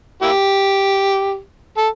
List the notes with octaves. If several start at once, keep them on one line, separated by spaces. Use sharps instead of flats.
A#3 E4 G4
A4